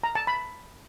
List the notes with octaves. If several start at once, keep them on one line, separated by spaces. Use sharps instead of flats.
A#5
A5
B5